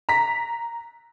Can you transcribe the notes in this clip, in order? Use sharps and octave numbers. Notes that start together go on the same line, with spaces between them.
A#5 B6